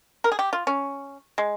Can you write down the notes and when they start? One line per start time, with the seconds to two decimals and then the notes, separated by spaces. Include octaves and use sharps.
0.24 A#4
0.32 G#4
0.39 G4
0.53 F4
0.67 C#4
1.38 G#3